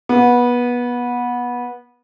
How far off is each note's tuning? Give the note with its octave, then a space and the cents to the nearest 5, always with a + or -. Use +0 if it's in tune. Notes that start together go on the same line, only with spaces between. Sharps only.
B3 -20